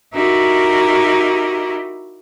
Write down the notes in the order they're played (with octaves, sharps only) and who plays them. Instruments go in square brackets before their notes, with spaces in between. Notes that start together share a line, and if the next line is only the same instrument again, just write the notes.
[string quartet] D#4 E4 F#4 G4 A#4